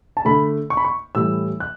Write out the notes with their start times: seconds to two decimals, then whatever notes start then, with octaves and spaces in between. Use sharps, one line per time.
0.17 A5
0.25 D3 A3 B5
0.70 C#6
0.77 B5
0.85 C#6
1.15 A2 E3 G3 E6
1.60 F#6